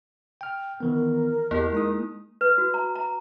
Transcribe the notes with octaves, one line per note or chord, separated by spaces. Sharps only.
G5 F6
D#3 E3 B3 A#4
E2 A#3 E4 G4
G#3 D#4 D#6
B4
F#4
A#5
A#5